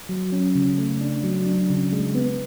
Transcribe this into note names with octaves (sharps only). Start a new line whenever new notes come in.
F#3
C#4
C#3
A3
D4
F#3
D4
C#3
G#3
B3